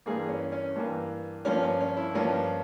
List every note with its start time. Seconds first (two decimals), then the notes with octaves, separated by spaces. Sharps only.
0.06 G2 E3 A#3 G#4
0.29 C#4
0.52 C#4
0.76 G2 E3 A#3
1.45 G2 F3 A#3 C#4
1.63 C#4
1.81 C#4
1.97 E4
2.14 G2 F3 A#3 C#4